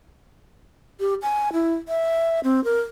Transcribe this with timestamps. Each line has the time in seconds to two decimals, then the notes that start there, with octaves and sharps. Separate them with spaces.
1.00 G4
1.22 G#5
1.53 E4
1.88 E5
2.44 C4
2.64 A#4